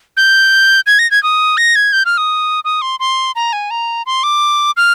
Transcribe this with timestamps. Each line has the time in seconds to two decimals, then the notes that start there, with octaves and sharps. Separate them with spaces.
0.17 G6
0.87 G#6
0.99 A#6
1.11 G#6
1.23 D#6
1.57 A#6
1.76 G#6
1.93 G6
2.06 F6
2.18 D#6
2.65 D#6
2.82 C6
3.00 C6
3.36 A#5
3.53 G#5
3.71 A#5
4.06 C6
4.23 D6
4.77 F6